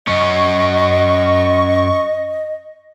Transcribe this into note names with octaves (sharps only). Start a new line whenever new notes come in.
F#2 C#4 D#5 C#6